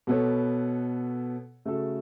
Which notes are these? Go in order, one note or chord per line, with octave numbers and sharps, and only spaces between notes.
B2 B3 A4 C#5
C#3 A3 F#4 A4